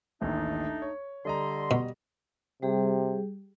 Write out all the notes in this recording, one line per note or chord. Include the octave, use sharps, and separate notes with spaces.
A1 D#2 A3 D4 D#4
C#5
D3 G3 D#5 A#5 C6
B2
C3 G3 G4 G#4